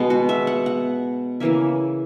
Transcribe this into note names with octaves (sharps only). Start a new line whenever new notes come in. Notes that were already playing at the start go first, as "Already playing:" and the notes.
Already playing: B2 G#3 B3
F#4
E5
F#5
F#5
C#3 E3 A#3 E5